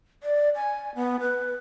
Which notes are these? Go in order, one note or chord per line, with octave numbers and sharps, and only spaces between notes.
D5
G#5
B3
B4